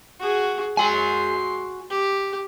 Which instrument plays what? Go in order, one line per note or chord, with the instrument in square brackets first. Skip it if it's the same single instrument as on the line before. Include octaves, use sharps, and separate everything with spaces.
[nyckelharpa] F#4 G#4
[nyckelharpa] G#3 C6 [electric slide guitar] F#4 G#5
[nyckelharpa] G4